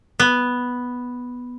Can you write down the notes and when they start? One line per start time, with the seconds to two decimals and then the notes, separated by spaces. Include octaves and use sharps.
0.20 B3